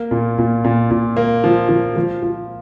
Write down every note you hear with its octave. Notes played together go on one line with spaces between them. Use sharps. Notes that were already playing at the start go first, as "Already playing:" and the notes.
Already playing: A#3
A#2
A#2
A#2
A#2
A#3
F3
F3
F3
F3